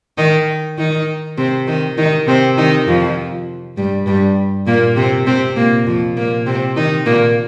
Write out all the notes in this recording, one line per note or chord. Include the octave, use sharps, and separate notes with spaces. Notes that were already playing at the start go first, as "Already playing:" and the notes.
D#3 D#4
D#3 D#4
C3 C4
D#3 D#4
D#3 D#4
C3 C4
D#3 D#4
F2 F3
G2 G3
G2 G3
A#2 A#3
C3 C4
C3 C4
A#2 A#3
F2 F3
A#2 A#3
C3 C4
D#3 D#4
A#2 A#3